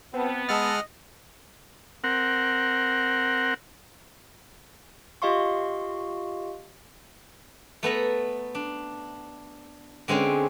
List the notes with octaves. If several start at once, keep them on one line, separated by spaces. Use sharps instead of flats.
B3 C4 A5
G#3 D#5 F#5 A5 E6 F6 A6
C4 A#4 F#5
F4 G4 D#5 F5 C6 C#6
A3 B3 A4 A#5
D4
D3 G#3 C4 C#4